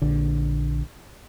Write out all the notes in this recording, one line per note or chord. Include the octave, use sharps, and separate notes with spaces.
A#1 D3